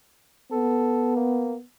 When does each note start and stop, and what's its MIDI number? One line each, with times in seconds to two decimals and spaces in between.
0.52 1.63 59
0.52 1.15 69
1.16 1.55 58